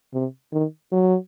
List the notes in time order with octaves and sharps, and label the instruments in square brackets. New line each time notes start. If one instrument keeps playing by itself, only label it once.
[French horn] C3
D#3
F#3